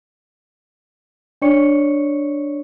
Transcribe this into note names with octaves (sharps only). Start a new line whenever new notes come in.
D4 C#5 D5 C#6 C#7